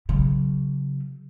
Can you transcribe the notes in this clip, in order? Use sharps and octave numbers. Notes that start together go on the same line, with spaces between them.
C#3 F#3